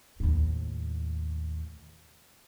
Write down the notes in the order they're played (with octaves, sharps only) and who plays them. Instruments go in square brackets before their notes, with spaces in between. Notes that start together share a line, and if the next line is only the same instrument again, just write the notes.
[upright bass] D#2 A2